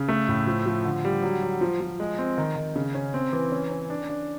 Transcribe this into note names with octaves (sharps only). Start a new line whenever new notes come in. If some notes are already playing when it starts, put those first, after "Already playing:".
Already playing: C#3
A3
A2
F3
F3
D3
G3
F#3
F#3
F3
F3
G#3
C4
D#3
D#3
C#3
C#4
C4
E3
C#4
C#4
D4
D4